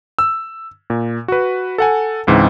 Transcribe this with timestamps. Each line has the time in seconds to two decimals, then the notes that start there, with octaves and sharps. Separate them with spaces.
0.19 E6
0.90 A#2
1.28 F#4 B4
1.78 A4 F#5 G#5
2.27 C#2 G#2 E3 C4